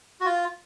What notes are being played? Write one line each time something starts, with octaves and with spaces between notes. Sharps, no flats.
F#4
F4